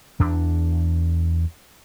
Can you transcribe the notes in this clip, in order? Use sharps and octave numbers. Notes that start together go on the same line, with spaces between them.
E2 D4